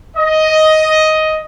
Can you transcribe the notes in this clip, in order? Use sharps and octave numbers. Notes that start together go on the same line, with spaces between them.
D#5